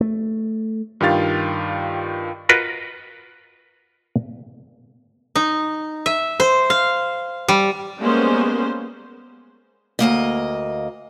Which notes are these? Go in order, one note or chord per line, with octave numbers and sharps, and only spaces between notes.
A3
G2 D#3 F4 G4 F5 A6
F4 F#4 A#4 B4 D#5
D#4
E5
C5
F5
G3
G3 G#3 A#3 B3 C#4 C5
D2 D#3 A#3 D#5